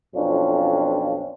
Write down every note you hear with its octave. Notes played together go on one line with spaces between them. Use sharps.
B1 F2 C#4 D4 F4